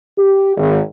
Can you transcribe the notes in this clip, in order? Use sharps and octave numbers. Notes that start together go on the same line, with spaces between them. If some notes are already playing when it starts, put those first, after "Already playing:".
G4
G#1